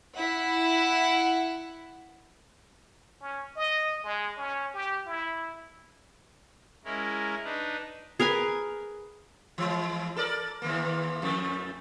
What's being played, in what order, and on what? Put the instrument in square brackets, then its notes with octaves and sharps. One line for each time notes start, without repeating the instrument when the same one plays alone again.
[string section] E4 F#5
[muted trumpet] C#4
D#5
G#3
C#4
G4
E4
[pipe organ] G#3 C#4 E4 A#4
D4 D#4 B4
[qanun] G#4 A#4 B4 G#5
[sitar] E3 G#3
A4 A#4 D5
D#2 E3 A#3
F2 A3